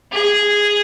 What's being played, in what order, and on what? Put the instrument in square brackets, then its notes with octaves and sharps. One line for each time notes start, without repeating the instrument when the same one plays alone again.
[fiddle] G#4